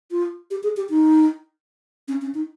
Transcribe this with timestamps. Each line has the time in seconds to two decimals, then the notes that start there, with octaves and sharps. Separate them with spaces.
0.11 F4
0.51 G4
0.63 G#4
0.77 G4
0.90 D#4
2.08 C#4
2.22 C#4
2.34 D#4